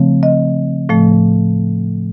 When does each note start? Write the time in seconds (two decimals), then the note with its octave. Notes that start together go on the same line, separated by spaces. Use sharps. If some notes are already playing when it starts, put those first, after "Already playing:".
Already playing: C#3 F3 A3 C4
0.23 D#5
0.89 A2 F3 A3